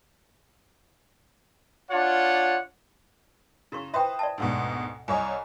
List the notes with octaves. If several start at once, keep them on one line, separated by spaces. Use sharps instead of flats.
D4 F4 C#5 F#5
C#3 E4 F#4 C#6
B4 C5 E5 G5 D#6
D5 E5 A5
D2 G#2 B2
C2 C#5 D#5 G#5